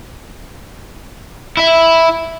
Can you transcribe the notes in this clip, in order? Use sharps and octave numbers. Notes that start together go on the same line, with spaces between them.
E4 E5